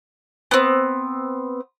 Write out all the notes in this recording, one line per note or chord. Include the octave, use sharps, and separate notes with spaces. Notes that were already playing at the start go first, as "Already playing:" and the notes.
B3 C4